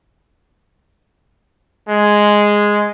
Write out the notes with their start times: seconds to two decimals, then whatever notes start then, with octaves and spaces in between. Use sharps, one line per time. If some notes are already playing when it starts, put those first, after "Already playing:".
1.89 G#3